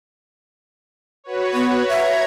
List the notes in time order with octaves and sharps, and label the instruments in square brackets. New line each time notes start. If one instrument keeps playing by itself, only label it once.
[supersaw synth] F#4 B4 C#5
[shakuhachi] B3
[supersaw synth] C#5 A#5 G#6 [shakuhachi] E5